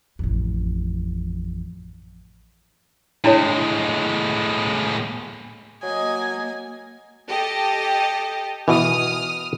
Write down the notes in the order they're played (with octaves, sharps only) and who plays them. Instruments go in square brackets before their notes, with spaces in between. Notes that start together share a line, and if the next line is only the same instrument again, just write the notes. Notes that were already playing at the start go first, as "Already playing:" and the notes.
[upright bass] A1 F2
[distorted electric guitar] A2 G#3 [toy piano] D4 E4 C#5
[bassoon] F#3 [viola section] A#3 D#5 [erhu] G#5
[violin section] G4 A4 D#5
[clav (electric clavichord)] B2 E3 [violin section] D#6 F6